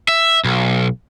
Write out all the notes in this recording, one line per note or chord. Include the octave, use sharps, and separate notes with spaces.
E5
B1